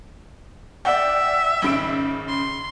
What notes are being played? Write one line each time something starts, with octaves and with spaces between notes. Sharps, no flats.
D5 E5 F#5 G5
G#1 C#3 D7
C6